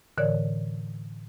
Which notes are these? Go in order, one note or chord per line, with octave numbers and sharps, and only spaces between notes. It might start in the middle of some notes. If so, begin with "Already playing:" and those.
A2 D3 E3 A#4 C#5 D5